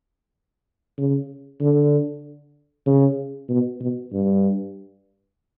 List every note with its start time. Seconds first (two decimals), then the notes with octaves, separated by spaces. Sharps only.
0.98 C#3
1.61 D3
2.87 C#3
3.49 B2
3.81 B2
4.13 G2